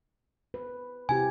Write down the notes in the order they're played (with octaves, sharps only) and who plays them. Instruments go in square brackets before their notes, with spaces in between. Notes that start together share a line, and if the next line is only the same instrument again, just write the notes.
[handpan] B4
[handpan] C3 E4 G4 [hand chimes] G#5